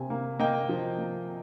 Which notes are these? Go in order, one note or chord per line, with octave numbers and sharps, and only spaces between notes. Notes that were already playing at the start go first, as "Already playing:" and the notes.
Already playing: C3 A#3 G#5
A#3
A#3 D#5 G5
F3
A#3